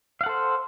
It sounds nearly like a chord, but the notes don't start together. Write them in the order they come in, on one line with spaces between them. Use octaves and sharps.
F5 F#5 A4 C5